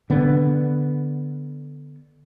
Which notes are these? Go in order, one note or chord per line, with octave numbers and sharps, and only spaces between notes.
D3 B3